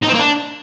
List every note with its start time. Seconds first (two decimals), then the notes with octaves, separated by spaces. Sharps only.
0.03 D#4
0.08 C4
0.14 A#3
0.19 D4